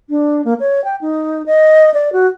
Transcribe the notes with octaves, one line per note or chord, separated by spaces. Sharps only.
D4
A#3
C#5
G5
D#4
D#5
D5
F#4